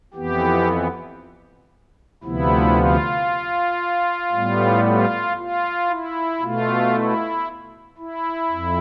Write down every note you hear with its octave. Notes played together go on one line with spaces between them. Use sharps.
F2 E3 B3 G4
D2 C3 F3 B3 E4
F4
A2 G3 B3
F4
F4
E4
B2 A3 F4
E4
E4
F2